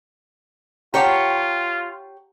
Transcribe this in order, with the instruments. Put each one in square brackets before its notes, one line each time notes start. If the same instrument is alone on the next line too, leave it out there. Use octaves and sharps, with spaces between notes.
[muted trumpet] F4 [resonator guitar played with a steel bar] G4 C#5 [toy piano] F#5 A5 A#5